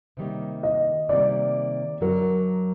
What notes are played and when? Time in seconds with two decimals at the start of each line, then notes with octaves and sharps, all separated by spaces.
0.17 C3 D#3 G3 A#3
0.63 D#5
1.09 C3 D#3 G3 A#3 D5
2.01 F#2 D3 F#3 A#4